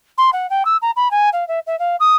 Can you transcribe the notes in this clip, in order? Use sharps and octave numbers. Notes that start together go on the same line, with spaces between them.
C6
F#5
G5
E6
A#5
B5
G#5
F5
E5
E5
F5
D#6